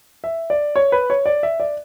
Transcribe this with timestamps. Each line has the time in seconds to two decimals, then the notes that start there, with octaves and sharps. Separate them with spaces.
0.24 E5
0.50 D5
0.76 C#5
0.92 B4
1.10 C#5
1.26 D5
1.43 E5
1.60 D5